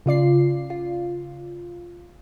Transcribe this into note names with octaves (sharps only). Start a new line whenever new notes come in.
C#3 F4 D5 C7
F4